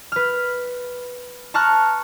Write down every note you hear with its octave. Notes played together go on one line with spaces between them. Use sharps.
B4 F6
A5 A#5 C#6 F6 F#6